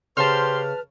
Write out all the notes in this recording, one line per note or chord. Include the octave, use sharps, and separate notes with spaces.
C#3 G4 B4 C5 A5 C6 F6